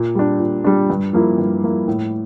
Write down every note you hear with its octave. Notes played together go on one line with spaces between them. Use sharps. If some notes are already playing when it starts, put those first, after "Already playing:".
Already playing: A#2
G3 D4
A#2
G3 D4
G2
F3 A#3 E4
G2
F3 A#3 E4
A2